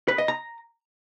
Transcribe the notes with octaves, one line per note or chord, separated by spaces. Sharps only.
B4
D#5
A#5